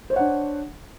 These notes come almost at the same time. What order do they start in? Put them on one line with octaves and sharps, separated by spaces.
C5 C#5 F#5 D4